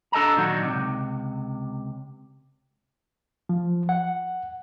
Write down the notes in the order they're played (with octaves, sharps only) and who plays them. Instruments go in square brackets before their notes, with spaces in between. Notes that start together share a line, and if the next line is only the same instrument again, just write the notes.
[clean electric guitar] D4 A4 D#5 A5 A#5
A#2 D#3 F#3 D4 D#4 F#4
C#2 F#2 C3
[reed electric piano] F3
F#5